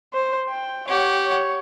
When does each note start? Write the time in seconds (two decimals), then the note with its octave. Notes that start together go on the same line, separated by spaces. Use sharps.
0.13 C5
0.50 G5
0.88 G4 C#5 F#5
1.26 C#5